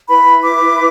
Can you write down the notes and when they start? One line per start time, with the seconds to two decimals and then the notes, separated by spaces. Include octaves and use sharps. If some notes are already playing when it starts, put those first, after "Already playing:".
0.09 E4 B4 B5
0.44 D6